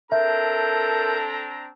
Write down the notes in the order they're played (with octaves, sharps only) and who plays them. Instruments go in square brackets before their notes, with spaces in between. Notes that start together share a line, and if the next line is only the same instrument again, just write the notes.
[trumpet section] C4 D4 A#5 [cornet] A4 [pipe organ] A#4 G6 [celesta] E5